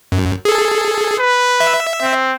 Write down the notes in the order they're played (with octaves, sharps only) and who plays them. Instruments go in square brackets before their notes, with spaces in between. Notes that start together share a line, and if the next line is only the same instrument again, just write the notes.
[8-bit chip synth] F#2
G#4 A4
[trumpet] B4
[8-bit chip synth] E5
[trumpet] C4